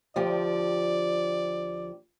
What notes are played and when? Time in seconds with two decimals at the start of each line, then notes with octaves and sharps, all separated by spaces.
0.16 D2 F3 G4 D5